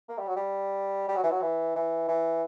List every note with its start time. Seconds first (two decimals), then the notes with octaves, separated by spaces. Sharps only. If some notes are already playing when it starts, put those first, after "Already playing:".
0.09 A#3
0.18 G3
0.27 F#3
0.36 G3
1.08 G3
1.16 F#3
1.23 E3
1.31 F#3
1.41 E3
1.75 E3
2.08 E3